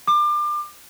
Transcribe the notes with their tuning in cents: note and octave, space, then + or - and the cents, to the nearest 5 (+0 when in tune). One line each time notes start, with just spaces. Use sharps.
D6 +30